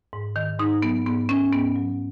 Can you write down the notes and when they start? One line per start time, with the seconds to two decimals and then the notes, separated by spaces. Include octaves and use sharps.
0.13 G#2
0.36 D#3
0.59 G#2 D#4
0.82 F#3 B3
1.06 G#2 B3
1.29 D#3 C#4
1.53 G#2 B3
1.76 F#3